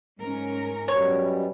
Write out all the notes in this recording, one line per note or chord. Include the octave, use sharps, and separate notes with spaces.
G#2 C#4 A#4
F#2 B2 G3 C#5